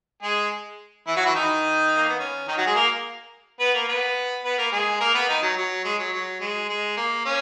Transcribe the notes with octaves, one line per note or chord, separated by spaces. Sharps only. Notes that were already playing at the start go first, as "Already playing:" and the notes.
G#3 G#4
E3 E4
F#3 F#4
E3 E4
D#3 D#4
A#3
B3
C#4
D#3 D#4
F#3 F#4
G#3 G#4
A#3 A#4
B3 B4
A#3 A#4
B3 B4
B3 B4
A#3 A#4
G#3 G#4
A#3 A#4
B3 B4
D#3 D#4
F#3
F#3
G#3
F#3
F#3
G#3
G#3
A#3
C#4